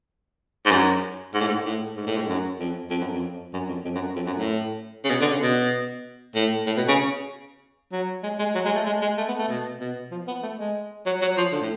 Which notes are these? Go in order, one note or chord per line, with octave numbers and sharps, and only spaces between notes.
G#2
F#2
G#2
A2
G#2
A2
G#2
A2
G#2
F#2
F2
F2
F#2
F2
F#2
F2
F2
F#2
F2
F#2
A2
C#3
B2
D3
C#3
B2
A2
A2
B2
C#3
F#3
G#3
G#3
F#3
G#3
A3
G#3
G#3
A3
B3
A3
B2
B2
F3
B3
A3
G#3
F#3
F#3
F3
D3
A2